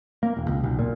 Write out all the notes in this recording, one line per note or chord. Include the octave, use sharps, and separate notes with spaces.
A#3
E1
C#2
B1
A#2